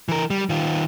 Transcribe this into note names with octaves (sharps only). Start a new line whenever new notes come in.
E3 A#4
G3
D#3 F4